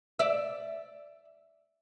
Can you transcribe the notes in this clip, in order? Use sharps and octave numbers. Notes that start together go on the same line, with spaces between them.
D5 E5